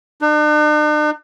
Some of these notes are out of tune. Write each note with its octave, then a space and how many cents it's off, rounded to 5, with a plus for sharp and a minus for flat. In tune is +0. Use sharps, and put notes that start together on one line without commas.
D4 +45